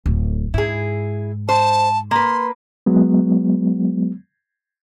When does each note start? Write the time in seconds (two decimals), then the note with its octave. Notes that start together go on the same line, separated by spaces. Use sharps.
0.06 D1
0.54 G#2 E4 G#4
1.49 C5 A5
2.11 A#3 B4 C6
2.86 F#3 G#3 B3